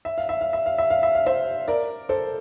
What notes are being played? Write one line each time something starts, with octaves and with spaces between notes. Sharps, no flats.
E5
F5
E5
F5
E5
F5
E5
F5
E5
F5
C5 E5
A#4 D5
A4 C5